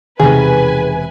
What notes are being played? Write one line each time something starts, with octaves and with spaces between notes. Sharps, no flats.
E1 C3 D#3 G#4 B4 G#5